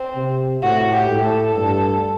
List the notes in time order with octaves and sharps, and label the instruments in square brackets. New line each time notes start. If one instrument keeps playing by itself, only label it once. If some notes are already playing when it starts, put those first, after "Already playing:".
Already playing: [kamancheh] C4
[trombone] C3
[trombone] A2 [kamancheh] F#4
[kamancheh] G4
[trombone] A2
[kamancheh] A4
[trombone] G2